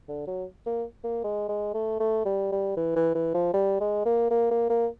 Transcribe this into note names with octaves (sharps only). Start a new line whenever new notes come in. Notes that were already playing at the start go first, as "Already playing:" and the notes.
D3
F#3
A#3
A#3
G#3
G#3
A3
A3
G3
G3
E3
E3
E3
F3
G3
G#3
A#3
A#3
A#3
A#3